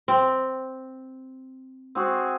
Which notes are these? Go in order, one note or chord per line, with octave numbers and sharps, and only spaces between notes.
C4
C4 F#4 G#4